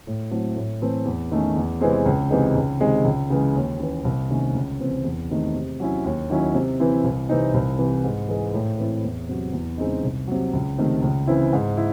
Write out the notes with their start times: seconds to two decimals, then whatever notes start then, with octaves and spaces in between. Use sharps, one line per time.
0.07 A2
0.31 F#3 A3 C4 E4
0.56 A2
0.82 E3 A3 C4
1.05 E2
1.31 D#3 A3 C#4
1.56 E2
1.81 C3 E3 G#3 C4
2.06 C#2
2.30 C3 E3 G#3 D#4
2.55 C#2
2.80 C3 D#3 G#3
3.05 C#2
3.30 C#3 E3 G#3
3.55 D#2
3.80 C#3 E3
4.04 C2
4.30 C3 D#3 A3 C#4
4.54 C#2
4.80 C3 E3 C4
5.05 E2
5.30 C3 D#3 A3
5.55 C3
5.80 F#3 C#4 E4
6.04 D#2
6.30 D#3 F#3 C#4 E4
6.54 C3
6.80 E3 C4 E4
7.04 C2
7.29 C3 E3 C4 D#4
7.54 C2
7.79 C3 E3
8.04 G#2
8.28 E3 G#3
8.54 A2
8.78 E3 C4 E4
9.04 E2
9.29 C3 F#3
9.53 E2
9.78 C#3 G#3 C4 D#4
10.03 C2
10.27 C3 F#3
10.53 C#2
10.78 C3 D#3 A3 D#4
11.02 C#2
11.27 C#3 E3 C4 E4
11.53 G#2
11.77 E4